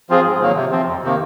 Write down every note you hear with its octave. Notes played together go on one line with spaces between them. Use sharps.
F3 C4 F4 G#4
G#2
D#3 F#3 A#3
C3
F3 C4
F2
C3 D#3 A#3